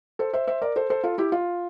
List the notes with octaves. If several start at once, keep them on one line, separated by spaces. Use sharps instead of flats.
A4 C5
C5 E5
C5 E5
A#4 D5
A4 C5
A4 C5
F4 A4
E4 G4
F4